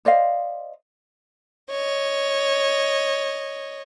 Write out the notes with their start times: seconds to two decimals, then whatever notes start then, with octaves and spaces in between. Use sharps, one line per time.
0.05 C5 D5 D#5 F5
1.71 C#5 D#5